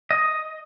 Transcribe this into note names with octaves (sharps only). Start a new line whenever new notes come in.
D#5